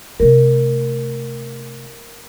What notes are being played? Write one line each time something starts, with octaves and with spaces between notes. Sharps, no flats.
C3 A3 A#4